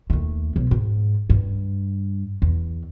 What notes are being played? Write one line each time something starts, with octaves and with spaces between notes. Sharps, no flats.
D#2 A3
B1 F#3
G#2
G2
E2